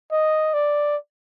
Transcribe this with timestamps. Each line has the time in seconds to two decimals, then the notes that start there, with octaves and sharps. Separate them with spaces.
0.12 D#5
0.54 D5